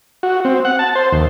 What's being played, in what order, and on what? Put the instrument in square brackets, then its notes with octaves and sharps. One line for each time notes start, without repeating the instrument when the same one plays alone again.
[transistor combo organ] F#4
C4
F#5
A5
C5
D#2